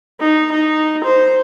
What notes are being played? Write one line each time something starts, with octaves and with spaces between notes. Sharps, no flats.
D#4
D#4
C5